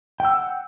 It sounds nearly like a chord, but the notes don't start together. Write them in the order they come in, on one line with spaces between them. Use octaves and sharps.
G5 E6 F#5